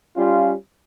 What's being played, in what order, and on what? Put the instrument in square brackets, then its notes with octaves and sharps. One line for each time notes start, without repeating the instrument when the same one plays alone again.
[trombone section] G3 C#4 F4